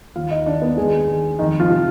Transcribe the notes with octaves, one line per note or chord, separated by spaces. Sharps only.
D#2 F4 F5
D#4 D#5
D#3 D4 D5
B3 B4
D#2 G#3 G#4
D#3
F2 D#3 D#4
F3 F4
C3 F3